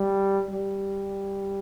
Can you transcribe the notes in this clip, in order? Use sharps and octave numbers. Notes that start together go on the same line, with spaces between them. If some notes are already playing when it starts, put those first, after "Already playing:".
Already playing: G3
G3